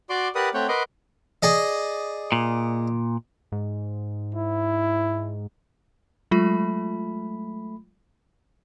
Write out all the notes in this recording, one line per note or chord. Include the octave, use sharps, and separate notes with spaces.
F#4 D5 C6 D6
G4 A#4 B4 D5 F#5 D#6
A3 C4 C#5 F#5 G5
A#4 B4 D#5 F#5 C6 D6
G#4 D5 D#5
A#2
G#2
E4
F#3 G#3 A3 F4 B5